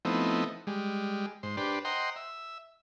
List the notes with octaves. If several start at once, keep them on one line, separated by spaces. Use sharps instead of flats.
F3 A3 B3 C4 D#4 E4
G3 G#3
G#2 C5
D4 G4 B4 C5
C5 D#5 F#5 G5 A#5 C6
E5